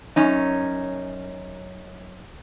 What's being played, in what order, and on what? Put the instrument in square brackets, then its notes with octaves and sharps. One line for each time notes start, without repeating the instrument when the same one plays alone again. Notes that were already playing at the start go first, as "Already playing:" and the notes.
[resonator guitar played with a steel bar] F#2 C#4 D#4